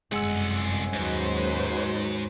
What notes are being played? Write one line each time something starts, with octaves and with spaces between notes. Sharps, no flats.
G1 C2 F#2 G#3 F#5 G#5 E6
D#2 G#2 F#3 C#4 B4 C5